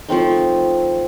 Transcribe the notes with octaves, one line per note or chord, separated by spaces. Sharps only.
F3 A3 C4 D#4